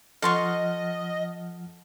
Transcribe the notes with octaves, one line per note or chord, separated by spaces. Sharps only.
F3 A4 D#5 F#5 C6 C#6 F6